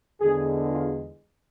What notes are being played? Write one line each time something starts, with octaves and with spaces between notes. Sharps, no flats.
E2 D3 G#3 G#4
F4